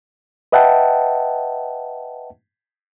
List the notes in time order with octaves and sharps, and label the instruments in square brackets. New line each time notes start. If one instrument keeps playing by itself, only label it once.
[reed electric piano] B4 D#5 E5 F#5 G5 A5